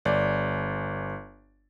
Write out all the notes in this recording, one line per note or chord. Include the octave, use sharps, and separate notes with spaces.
G1 D5